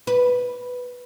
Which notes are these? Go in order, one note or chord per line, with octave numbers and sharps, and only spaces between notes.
B4